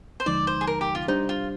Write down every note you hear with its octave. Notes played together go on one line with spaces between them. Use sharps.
C5
D#2 D3 F3 G#3 D#4 D5
C5
G#4
A#4
G4
F4
G3 D4 D#4 G4 C5
F4